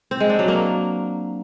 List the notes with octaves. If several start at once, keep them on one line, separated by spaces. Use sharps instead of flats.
C4
G#3
D4
F#3
A#3